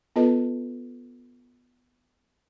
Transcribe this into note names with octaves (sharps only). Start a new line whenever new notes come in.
B3 F4 A4 B4 D#5 A5